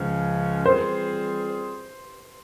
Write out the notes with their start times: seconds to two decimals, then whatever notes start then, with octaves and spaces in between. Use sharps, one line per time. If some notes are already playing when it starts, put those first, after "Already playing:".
Already playing: C#2 C#3 F3 G#3 C#4
0.65 E3 G3 C4 F4 G#4 C5